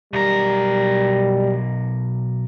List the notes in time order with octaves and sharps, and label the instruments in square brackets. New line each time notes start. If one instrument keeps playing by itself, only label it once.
[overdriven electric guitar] B1 A#4 [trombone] G3